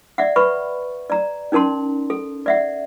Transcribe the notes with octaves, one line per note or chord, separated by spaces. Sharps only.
D5 E5 F#5
B4 B5 C#6
D5 A#5
C#4 D#4 A#4 A5 C6
A4
D5 E5 F#5